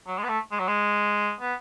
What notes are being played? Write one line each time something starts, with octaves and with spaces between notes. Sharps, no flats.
F#3
G#3
B3
A3
G#3
F#3
G#3
B3